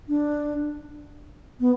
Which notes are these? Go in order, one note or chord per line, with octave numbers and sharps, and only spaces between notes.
D4
B3